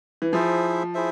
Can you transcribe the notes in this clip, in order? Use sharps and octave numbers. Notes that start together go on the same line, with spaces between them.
E3
F3 E4 G#4 C5 E5
E4 G#4 C5 E5